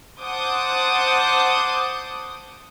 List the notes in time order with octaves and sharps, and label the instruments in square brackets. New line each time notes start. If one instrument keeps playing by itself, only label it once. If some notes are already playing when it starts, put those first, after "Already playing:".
[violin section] C5 F#5 A5 D6 D#6 G6